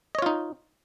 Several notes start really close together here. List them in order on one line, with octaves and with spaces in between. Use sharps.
D#5 C#5 F4 D#4